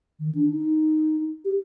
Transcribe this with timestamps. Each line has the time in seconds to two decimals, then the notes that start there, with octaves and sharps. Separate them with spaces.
0.20 D#3
0.35 D4
0.50 D#4
1.45 G4